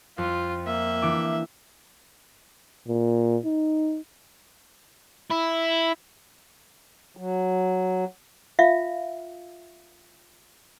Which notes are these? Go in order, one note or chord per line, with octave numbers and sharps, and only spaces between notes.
F2 F4
A#3 E5
E3 D4 D6
A#2
D#4
E4
F#3
F4 E5 F5